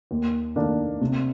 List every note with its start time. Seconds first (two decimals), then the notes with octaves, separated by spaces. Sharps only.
0.11 D#2
0.56 D#3 A#3 D4
1.01 C3